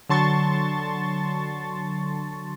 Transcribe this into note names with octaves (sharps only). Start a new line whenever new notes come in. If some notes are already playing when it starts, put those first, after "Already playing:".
D3 F#3 A5 C6 C#6 A6